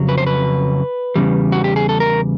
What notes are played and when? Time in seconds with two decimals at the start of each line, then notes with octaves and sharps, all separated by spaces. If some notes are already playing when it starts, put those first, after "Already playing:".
Already playing: F2 C#3 F#3
0.09 B4
0.18 C5
0.27 B4
1.16 E2 C#3 E3 G3
1.52 F#4
1.64 G4
1.76 G#4
1.89 A4
2.00 A#4